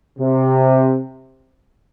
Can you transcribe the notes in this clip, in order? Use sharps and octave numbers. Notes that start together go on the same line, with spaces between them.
C3